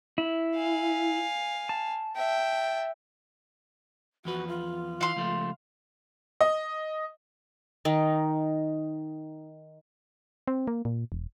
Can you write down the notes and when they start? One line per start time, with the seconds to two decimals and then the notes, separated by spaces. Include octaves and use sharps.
0.18 E4
0.56 F5 G#5
1.69 A5
2.16 E5 G5
4.25 E2 F3 F#4 B4
4.48 F4
5.01 E3 F5 C6
5.16 C#2 F3 A3
6.41 D#5
7.85 D#3 D#4
10.48 C4
10.67 A#3
10.85 A#2
11.12 E1